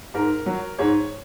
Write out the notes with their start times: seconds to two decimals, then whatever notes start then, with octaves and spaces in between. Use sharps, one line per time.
0.14 G#2 A#4
0.46 F#3
0.79 G#2 C#5